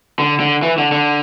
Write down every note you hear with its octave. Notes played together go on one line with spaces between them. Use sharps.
D3
D3
E3
D3
D3